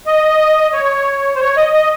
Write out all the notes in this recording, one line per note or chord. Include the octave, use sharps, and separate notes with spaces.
D#5
C#5
C5
C#5
D#5
D#5